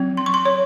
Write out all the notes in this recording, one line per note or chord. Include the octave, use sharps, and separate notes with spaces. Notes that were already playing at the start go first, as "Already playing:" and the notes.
Already playing: F#3 C4
C6
C#6
C6
C#5